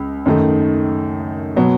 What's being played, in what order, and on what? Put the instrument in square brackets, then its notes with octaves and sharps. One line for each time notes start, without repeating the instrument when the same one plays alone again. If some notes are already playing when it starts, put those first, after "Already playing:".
Already playing: [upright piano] C#2
F#2 D#3 A3 D#4
B2 F#3 B3